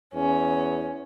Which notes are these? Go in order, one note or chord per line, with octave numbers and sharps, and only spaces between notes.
E2 C#4